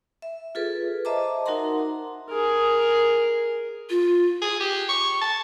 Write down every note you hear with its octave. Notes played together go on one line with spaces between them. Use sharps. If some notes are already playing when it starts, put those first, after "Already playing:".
E5
F4 G#4 A4 B4
C5 D#5 E5 A5 A#5 D6
D#4 F#4 A#4 F#5 A#5 C6
G#4 A#4
F4
G#4
G4
C#6
A5